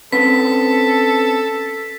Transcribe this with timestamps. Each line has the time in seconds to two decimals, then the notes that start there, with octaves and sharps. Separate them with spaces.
0.13 C4 C#4 A4 B4 B6